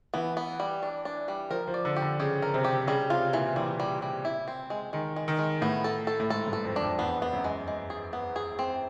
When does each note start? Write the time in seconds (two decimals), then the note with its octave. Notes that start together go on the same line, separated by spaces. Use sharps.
0.14 E3 B3
0.37 B3
0.60 G3
0.83 D4
1.05 D4
1.28 G3
1.50 F3 A#4
1.67 F3
1.74 D5
1.85 D3
1.96 G4
2.02 D3
2.20 C#3 G4
2.42 A#4
2.54 C3
2.64 G4
2.87 C#3 G3
3.10 C3 F4
3.33 A#2 E3
3.56 E3 G3
3.80 G3
4.02 G3
4.25 E4
4.48 C4
4.70 G#3
4.93 D#3 G#3
5.16 G#3
5.28 D#3
5.39 G#3
5.61 A2 B3
5.84 A4
6.07 A4
6.20 A2
6.30 G#2 A4
6.47 G2
6.53 A4
6.64 F2
6.76 D4
6.82 F2
6.98 E2 B3
7.22 B3
7.33 F#2
7.44 G#3
7.68 G#3
7.90 G#4
8.13 B3
8.36 G#4
8.59 C4